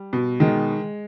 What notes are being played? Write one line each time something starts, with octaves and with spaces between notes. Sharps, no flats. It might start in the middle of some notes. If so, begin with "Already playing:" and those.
Already playing: G3
B2
D#3 G#3